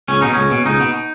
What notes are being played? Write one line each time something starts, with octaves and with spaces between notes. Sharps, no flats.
C#2 C#4
B2 D#4
C#2 C#4
B2
C#2 D#4
B2